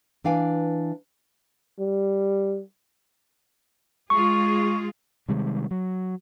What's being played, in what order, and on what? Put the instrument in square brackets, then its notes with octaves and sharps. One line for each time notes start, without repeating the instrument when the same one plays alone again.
[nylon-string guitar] E3 D4 B4 F5 G5 G#5
[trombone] G3
[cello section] G#3 F4 G#4 [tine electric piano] C#6
[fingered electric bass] C3 D#3 G3 G#3
F#3